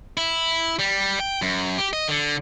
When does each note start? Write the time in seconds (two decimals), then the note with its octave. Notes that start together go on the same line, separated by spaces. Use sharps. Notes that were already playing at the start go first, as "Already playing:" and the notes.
0.17 E4
0.79 G3
1.20 G5
1.42 F#2
1.78 G4
1.93 D#5
2.08 D3